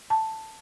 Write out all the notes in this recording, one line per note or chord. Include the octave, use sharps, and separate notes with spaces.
A5